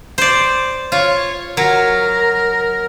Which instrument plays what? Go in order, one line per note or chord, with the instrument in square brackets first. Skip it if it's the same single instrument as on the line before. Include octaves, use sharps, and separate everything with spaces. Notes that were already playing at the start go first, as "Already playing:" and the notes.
[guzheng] C5 D5
[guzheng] F4 [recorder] C#5
[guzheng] F#3 [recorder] A#4